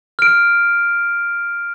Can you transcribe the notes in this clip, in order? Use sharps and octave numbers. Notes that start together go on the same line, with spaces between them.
F6 D7